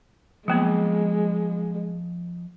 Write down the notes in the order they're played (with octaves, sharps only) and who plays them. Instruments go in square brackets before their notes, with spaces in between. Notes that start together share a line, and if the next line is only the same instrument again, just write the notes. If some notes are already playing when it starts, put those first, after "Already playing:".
[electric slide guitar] F3 D#5 G#5 [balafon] F#3 A#3 B3 [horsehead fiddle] G#3